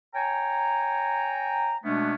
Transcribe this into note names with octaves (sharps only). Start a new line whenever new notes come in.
C#5 G5 G#5 A#5
B2 G#3 A3 B3 C#4 D4